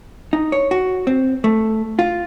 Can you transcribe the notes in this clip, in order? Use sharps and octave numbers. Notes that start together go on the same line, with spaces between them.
D#4
C#5
F#4
C4
A3
F4